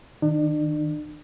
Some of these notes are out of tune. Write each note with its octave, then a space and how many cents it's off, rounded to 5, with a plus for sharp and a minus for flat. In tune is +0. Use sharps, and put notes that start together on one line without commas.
D#3 +0 D4 +40